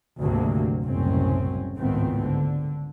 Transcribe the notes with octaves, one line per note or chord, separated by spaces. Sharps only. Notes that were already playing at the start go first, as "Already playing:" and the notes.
G#1 D2 C3 F#3 A#3
F#1 C2 F#2 A2 C4 C#4
G#1 C#2 A2 D#3 B3 C4
D3